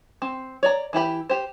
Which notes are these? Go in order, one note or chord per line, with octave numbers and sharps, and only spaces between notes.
C4
C#5 D5 A#5
E3 E4 G4 B5
G4 C5